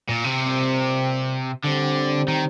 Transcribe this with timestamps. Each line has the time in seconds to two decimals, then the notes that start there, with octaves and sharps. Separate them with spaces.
0.09 A#2
0.24 C3
0.40 A#2 G3 C4
1.65 A2 D3 G3 C4
2.28 D#3